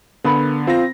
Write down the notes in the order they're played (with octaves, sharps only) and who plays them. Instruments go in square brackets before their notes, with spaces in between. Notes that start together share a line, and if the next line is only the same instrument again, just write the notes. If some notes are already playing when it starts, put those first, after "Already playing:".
[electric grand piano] D3 B3 [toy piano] A#4 F5 B5
[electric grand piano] C4 A#6 [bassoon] F4